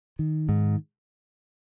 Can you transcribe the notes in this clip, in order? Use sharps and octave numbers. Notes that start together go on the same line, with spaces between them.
D#3
G#2